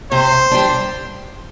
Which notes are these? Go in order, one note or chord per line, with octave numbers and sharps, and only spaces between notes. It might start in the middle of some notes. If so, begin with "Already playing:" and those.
C3 C5
G3 D4